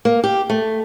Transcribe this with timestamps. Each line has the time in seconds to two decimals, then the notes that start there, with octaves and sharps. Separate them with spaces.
0.05 A#3
0.24 G4
0.50 A3